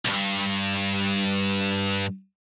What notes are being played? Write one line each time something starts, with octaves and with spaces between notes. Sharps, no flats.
B1 G2